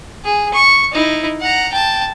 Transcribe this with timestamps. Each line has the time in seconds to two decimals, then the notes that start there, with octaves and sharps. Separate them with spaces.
0.24 G#4
0.54 C#6
0.91 D#4 E4
1.40 F#5 A#5
1.72 G5 A5